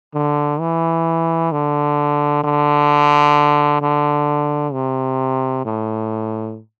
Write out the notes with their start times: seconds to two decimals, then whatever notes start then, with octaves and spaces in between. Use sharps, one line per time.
0.14 D3
0.60 E3
1.52 D3
2.43 D3
3.81 D3
4.73 C3
5.65 A2